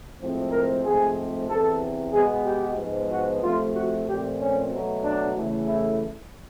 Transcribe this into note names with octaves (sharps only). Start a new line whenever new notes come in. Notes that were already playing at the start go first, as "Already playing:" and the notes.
A2 F3 G#3 C4
A#4
G#2 F3 A3 C4 G#4
E2 C3 E3 A4
B2 G#3 B3 G#4
G4
G#2 F3 G#3 B3
F#4
C3 F3 A3 F4
F#4
A#2 F3 A3 C4 G4
C#4
B2 F#3 A3
D4
E2 C#3 E3 A3
E4